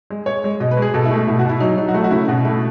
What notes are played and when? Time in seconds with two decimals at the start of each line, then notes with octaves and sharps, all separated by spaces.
0.10 G#3
0.26 G#3 C#5
0.44 G#3
0.60 B2 D#5
0.71 B4
0.77 G#3
0.82 G#4
0.94 B2 A4
1.05 E4
1.11 A3
1.27 B2 E4
1.39 F#4
1.45 B2 E4
1.60 F#3 D#4
1.77 F#3 D#4
1.88 F#4
1.94 A3 E4
2.04 F#4
2.11 C#3 E4
2.28 B2 F#4
2.45 A3 E4